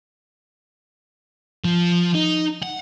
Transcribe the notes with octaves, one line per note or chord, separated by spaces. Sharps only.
F3
D#4
F#5